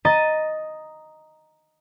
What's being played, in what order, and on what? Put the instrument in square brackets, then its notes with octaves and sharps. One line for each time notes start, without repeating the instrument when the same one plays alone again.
[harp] D#5 A#5 A6 D#7